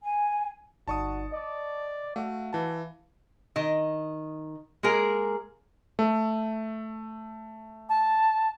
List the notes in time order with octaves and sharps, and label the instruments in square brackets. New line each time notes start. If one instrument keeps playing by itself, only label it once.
[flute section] G#5
[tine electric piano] G1 D#4 D5 [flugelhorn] F#4 [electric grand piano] A5 C#6 D#6
[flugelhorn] D5 [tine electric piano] D#5 D6
[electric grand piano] A3 [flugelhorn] F#4 [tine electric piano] F5
[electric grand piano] E3 A5
[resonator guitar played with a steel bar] D#3 D#5
G#3 A#3 G#4 A#4
[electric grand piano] A3
[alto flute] A5